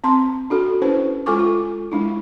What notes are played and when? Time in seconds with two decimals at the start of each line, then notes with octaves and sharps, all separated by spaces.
0.04 C4 A5 C6
0.50 D4 F#4 A4
0.82 C#4 E4 B4 C5
1.26 G#3 F4 A4 G#5 C#6 D6
1.39 F4
1.92 G#3 D4 E4